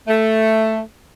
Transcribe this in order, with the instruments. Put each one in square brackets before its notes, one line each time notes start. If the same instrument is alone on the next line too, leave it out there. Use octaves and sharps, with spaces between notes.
[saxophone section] A3